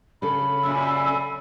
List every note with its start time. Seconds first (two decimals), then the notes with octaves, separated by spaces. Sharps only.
0.22 C#3 C#4 A4 B5
0.63 F#2 A#2 E6